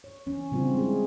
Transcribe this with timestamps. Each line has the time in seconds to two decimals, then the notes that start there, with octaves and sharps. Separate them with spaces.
0.04 C#5
0.26 E3 C#4
0.52 C#3 G3 C4 D4 F4
0.74 G#3 E4 G#4